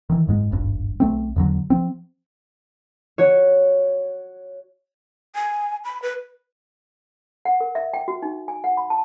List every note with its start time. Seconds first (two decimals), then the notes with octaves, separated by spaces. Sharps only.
0.10 D#3 E3
0.27 F#1 G#2 G#3
0.51 D#1 G#1 G2
1.00 B1 A3 C4
1.36 E2 D3 F#3
1.70 F3 C4
3.18 F#4 C#5
5.35 G#5
5.85 B5
6.02 B4
7.45 F#5
7.60 A#4
7.75 E5
7.94 G5
8.08 F#4
8.22 D#4
8.48 G#5
8.64 F#5
8.77 B5
8.90 A5